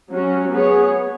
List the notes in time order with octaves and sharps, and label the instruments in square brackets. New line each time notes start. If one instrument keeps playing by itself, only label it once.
[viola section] F#3 C#4 F#4
B3 G#4 C#5